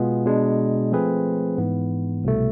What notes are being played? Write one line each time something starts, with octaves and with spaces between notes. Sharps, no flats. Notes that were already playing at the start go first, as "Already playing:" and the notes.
Already playing: B2 G#3 B3 F4 G#4
B2 G#3 D4
F3 A3 C4 G#4 B4
G#2 E3 B3
C2 B2 A3